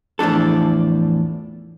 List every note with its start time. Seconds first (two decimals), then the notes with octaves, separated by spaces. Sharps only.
0.19 E2 A2 F3 D4 A4